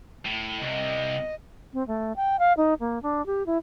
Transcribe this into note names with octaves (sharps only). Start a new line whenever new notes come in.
A2
C2 C3 D#5
C4
A3
G5
F5
D#4
A#3
D4
G4
E4